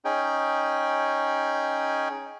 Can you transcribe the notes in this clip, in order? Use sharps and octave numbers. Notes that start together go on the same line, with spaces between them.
C#4 D#4 G#4 G5